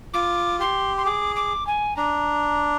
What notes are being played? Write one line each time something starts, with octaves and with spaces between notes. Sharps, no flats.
F4 D6
G4 C6
C6
G#4 D6
D6
G#5
D4 A#5